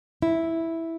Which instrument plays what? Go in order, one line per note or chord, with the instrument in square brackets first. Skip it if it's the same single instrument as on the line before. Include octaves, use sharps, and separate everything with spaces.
[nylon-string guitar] E4